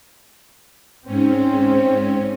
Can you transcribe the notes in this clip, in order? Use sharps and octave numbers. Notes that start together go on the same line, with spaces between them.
G#2 C4 C#4